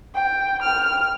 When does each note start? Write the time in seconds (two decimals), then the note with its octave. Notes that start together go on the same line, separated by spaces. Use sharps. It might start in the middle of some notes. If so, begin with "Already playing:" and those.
0.14 G5
0.62 F6